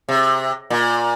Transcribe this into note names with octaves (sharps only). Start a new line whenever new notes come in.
C3
A#2